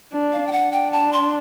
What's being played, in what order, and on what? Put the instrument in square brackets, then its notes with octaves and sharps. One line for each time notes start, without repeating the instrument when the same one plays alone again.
[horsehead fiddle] D4
[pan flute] F5
G5
[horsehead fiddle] D4 [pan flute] F#5
[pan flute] G5
A5
C6